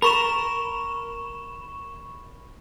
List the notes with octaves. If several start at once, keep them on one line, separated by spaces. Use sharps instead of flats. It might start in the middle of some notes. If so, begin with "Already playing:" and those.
A#4 B5 C#6 E7